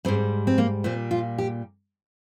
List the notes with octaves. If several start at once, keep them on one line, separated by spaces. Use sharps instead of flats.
G#2 G3 C4
C4
A#3
A#2 G3 C4
F4
G4